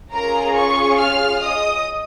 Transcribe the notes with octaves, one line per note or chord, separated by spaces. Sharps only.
C#4 F4 G#4 A#4 A#5
C#5 C#6
F5 F6
D#5 D#6